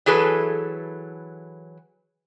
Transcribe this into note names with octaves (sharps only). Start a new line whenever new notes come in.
E3 F#3 G#4 A4 B4